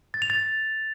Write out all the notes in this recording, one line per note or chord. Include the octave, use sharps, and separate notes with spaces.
A6
F7
A6